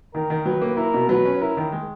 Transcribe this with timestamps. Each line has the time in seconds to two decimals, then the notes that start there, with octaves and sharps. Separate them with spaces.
0.14 D#3 A#4
0.30 D#3
0.45 F#3 B4
0.61 A#3
0.77 E4 A#4
0.94 B2
1.09 F#3 B4
1.25 C#4
1.41 E4 A#4
1.57 D#3
1.72 G#3